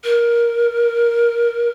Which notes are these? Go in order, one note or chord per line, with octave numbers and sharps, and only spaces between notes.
A#4